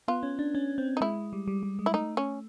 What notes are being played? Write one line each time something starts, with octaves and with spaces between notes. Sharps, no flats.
B3 F4
C#4
D4
C#4
C4
D#4
G#3 E4
G3
G3
G3
G#3
E4
A3 D#4
C#4